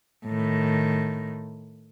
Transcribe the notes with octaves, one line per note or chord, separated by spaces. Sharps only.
A2 D#3